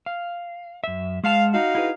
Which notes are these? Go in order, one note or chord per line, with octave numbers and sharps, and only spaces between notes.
F5
F#2 E5
G#3 F5 F#5 A5
D#4 F#4 F5
E4 G#4 B4